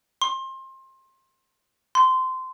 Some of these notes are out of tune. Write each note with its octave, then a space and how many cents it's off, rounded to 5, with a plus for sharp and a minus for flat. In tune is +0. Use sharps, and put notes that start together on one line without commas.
C6 +25
C6 -20